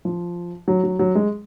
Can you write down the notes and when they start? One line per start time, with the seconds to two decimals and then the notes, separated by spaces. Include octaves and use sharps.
0.05 F3
0.68 F#3
0.84 F#3
0.99 F#3
1.15 G#3